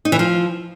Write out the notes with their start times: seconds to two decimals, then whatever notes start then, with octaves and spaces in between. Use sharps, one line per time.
0.05 D#4
0.12 E3
0.19 F3